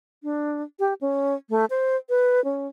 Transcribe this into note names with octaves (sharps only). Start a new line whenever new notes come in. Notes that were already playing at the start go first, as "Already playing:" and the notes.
D4
G4
C#4
A3
C5
B4
C#4